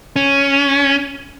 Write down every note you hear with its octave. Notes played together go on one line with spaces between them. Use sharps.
C#4